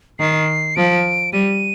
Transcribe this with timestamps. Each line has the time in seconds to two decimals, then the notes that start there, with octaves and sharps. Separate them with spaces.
0.19 D#3 C7
0.76 F3 D7
1.33 G3 D#7